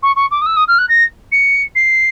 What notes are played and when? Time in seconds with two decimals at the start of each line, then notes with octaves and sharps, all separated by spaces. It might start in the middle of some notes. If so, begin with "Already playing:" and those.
0.02 C#6
0.16 C#6
0.31 D6
0.41 D#6
0.46 E6
0.56 D#6
0.67 F6
0.78 F#6
0.88 A#6
1.31 C#7
1.75 C7